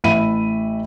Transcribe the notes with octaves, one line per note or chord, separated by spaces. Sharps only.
A1 E5 B5 D#7